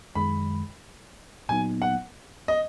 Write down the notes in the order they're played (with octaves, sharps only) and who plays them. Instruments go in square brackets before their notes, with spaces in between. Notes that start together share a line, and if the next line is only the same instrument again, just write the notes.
[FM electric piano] F#2 D#3 G#3 [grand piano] B5
[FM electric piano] A#2 F#3 B3 D#4 [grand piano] G#5
[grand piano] F#5
D#5